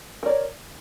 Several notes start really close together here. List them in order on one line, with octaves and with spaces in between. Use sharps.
A#4 D5 C#5